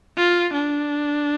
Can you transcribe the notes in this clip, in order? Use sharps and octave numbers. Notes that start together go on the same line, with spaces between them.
F4
D4